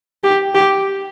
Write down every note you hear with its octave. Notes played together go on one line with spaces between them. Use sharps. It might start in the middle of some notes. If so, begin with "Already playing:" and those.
G4
G4